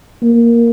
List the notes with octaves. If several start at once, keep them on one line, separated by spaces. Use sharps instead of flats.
A#3